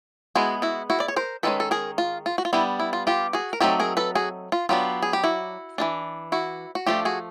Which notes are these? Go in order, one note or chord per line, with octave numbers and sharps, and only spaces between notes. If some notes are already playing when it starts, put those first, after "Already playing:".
G#3 B3 E4 F#4 G#4
E4 F#4
E4 F#4
D5
C#5
A#4 C5
D#3 G#3 C#4 A4 B4
A4
G#4 A#4
F4
F4
F#4
F4
G3 B3 D4 E4
E4
F4
F4 G4
F#4 G#4
A#4
F#3 A3 C4 D#4 G4 A4
G#4 A#4
A4 B4
F#4 G#4
F4
F#3 B3 D4 F4 G4
G#4
G4
E4 F#4
E3 A3 D4
E4 F#4
F#4
F3 A3 D4 F4 G4
F#4 G#4